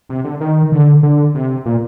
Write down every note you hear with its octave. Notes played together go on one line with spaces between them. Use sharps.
C3
D3
D#3
D3
D3
C3
A#2